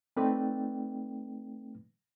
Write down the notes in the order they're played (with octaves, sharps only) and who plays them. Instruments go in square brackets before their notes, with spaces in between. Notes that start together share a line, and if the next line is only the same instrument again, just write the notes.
[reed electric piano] A3 C4 D#4 B4 D5 G5